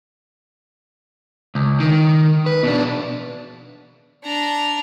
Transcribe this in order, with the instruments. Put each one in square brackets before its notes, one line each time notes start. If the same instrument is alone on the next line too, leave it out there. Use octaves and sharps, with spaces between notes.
[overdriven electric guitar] C#2
D#3
B4
B2 D4
[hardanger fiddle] D4 A#5